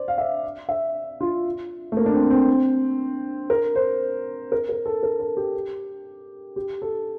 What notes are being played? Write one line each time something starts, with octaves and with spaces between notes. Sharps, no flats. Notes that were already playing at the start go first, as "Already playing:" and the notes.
Already playing: C5 D5
F5
E5
E5
F4
A3
A#3
D4
C4
C4
A#4
C5
A#4
A#4
A4
A#4
A4
G4
G4
A4